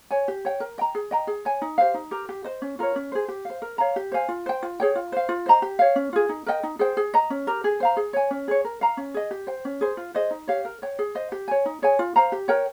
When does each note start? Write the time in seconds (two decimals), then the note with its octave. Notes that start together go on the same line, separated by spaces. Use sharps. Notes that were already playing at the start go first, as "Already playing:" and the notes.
0.11 C#5 G#5
0.28 G4
0.45 C#5 G5
0.60 A#4
0.78 D#5 G5 A#5
0.95 G#4
1.11 D#5 G5 A#5
1.27 G#4
1.45 C#5 G#5
1.62 D#4
1.78 G4 C5 F5
1.94 D#4
2.11 G4 A#4
2.29 G4
2.44 C5 D#5
2.62 C#4
2.79 F4 A#4 C#5
2.96 C#4
3.12 G#4 C5
3.28 G4
3.45 C5 F5
3.62 A#4
3.78 C#5 F5 A#5
3.96 G4
4.12 C5 F5 G#5
4.28 F4
4.46 C5 G5
4.63 F4
4.80 G#4 C#5 G5
4.95 F4
5.12 C5 F5
5.29 F4
5.46 C5 D#5 A#5
5.62 G4
5.79 C#5 F5
5.96 C#4
6.13 F4 G#4
6.29 D#4
6.46 A#4 D#5 G5
6.63 D#4
6.79 G#4 C5 G5
6.97 G#4
7.14 D#5 A#5
7.30 C#4
7.47 G4 A#4
7.64 G#4
7.80 C5 F5 A#5
7.97 G#4
8.13 C#5 G#5
8.31 C#4
8.48 G#4 C#5
8.65 A#4
8.81 F5 A#5
8.97 C#4
9.14 G#4 D#5
9.31 G4
9.47 C5 G5
9.65 C#4
9.81 G#4 C5
9.97 F4
10.14 G#4 C5 D#5
10.31 D#4
10.47 G4 C#5 F5
10.65 A#4
10.82 C#5 G5
10.99 G#4
11.15 C5 D#5
11.32 G4
11.48 C#5 G#5
11.66 D#4
11.82 G#4 C#5 G#5
11.99 F4
12.16 C5 F5 A#5
12.32 G4
12.48 A#4 C#5 G5